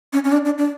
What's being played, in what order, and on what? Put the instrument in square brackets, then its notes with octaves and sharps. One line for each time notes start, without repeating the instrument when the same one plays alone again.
[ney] C#4
C#4
D4
D4
D4